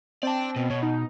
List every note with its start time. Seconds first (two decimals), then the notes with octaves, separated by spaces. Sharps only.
0.23 C4 D5 A5
0.56 B2
0.70 B2 C#5
0.83 D#4